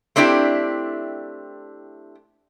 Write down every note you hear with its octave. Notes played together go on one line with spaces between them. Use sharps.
A3 C4 D4 E4 G4